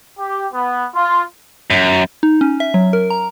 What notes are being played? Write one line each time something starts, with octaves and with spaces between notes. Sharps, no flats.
G4
B3
F4
F#2
D#4
C#4
E5
F#3
A#4
A#5